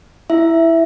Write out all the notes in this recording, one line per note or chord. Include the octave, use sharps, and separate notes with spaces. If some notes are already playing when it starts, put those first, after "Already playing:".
E4 E5